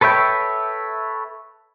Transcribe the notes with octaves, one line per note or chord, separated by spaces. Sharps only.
A4 B4 C#5 E5 G5